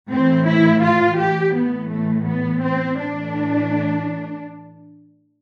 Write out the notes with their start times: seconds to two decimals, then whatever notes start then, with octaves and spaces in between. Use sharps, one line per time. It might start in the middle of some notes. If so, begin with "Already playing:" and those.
0.11 A2 E3 C4
0.47 E4
0.83 F4
1.18 G4
1.55 A2 E3 B3
1.90 A3
2.26 B3
2.62 C4
2.98 A2 E3 D4